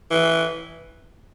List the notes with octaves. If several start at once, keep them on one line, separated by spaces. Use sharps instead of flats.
E3